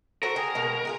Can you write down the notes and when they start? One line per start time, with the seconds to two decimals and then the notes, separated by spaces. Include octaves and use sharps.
0.23 F#4 A4 A#4 C5
0.36 G#4 G5
0.55 B2 G#3 A#3
0.85 F4 G4 G#4